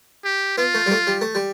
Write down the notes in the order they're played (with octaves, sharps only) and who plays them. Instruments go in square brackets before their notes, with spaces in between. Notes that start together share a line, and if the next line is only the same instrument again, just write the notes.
[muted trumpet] G4
[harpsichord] B3 [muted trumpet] F4
[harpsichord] A3
G3
A3
G3
A3
G3